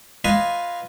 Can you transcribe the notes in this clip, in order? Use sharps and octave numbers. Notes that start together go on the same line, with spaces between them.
F4 B4 D#5 G#5